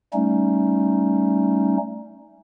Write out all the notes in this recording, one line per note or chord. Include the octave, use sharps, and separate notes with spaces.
G3 A3 C#4 D#4